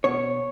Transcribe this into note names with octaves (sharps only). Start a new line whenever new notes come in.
B2 C#5